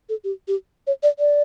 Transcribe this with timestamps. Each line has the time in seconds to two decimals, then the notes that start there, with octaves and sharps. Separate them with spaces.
0.09 A4
0.24 G4
0.48 G4
0.87 C#5
1.03 D5
1.19 D5